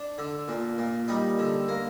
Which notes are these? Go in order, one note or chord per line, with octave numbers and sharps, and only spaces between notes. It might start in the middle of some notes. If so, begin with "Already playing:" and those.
Already playing: D4
D3
A#2
A#2
G3 D#4
D3
A#3